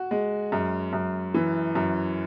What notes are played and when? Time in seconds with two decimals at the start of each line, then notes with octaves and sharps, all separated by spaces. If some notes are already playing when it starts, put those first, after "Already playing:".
Already playing: F#4
0.11 G#3
0.52 F#2
0.93 F#2
1.34 E3
1.75 F#2